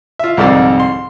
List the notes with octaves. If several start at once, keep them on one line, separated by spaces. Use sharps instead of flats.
F4 E5
C2 F2 G#2 A#4 D5 E6
C6